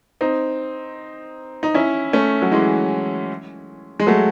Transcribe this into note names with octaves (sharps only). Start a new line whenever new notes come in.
C4 D#4
D#4
C#4 E4
A3 C#4
F#3
E3 G#3
G#3
F#3 A3